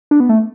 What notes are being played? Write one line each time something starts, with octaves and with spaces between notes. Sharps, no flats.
D4
B3
A3